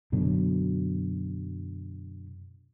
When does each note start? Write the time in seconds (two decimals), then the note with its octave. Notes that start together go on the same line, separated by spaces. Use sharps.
0.12 F#2 B2 D3 F#3